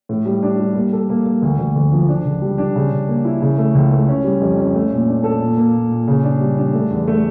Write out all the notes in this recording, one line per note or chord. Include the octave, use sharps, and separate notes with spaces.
A2
G3
D4
G3
A#3
A4
A#3
A#3
D2
D2
D2
F3
D4
C#2
G3
D4
C#3
C#3
A#3
E4
C#3
A3
C#2
A3
C#4
G3
F2
C#4
A3
A#2
D4
A4
A#2
A#3
A#2
A#2
C#3
D4
G3
D4
A3
E2
A3